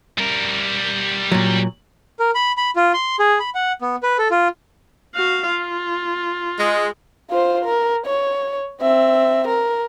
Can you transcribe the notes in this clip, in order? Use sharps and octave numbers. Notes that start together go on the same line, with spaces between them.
G3 A#4
A#2 F#3
A#4
B5
B5
F4
C6
G#4
B5
F#5
B3
B4
A4
F4
F#4 F5
F4
G#3
F4 C5
A#4
C#5
C4 E5
A#4